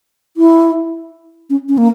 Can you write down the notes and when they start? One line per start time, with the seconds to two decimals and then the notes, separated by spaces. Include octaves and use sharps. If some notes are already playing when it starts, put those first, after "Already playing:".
0.37 E4
1.50 C#4
1.69 C#4
1.78 A#3